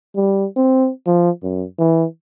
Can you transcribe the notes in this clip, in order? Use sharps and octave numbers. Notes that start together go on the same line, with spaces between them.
G3
C4
F3
F#2
E3